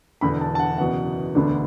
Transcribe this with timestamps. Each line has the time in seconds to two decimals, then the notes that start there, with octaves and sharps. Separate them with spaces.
0.21 E1 E2 D3 B5
0.41 A5
0.55 A5
0.59 F#5
0.78 F#1 E2 B2 F#5
1.35 E1 D2 D3 B3 D4